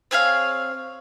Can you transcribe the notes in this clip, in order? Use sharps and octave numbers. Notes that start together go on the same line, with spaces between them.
C4 G#4 C#5 F5